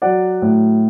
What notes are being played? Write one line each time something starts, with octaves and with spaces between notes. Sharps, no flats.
F#3 D5 F#5
A2